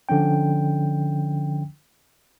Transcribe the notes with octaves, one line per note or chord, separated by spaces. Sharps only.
D3 F3 C#4 G5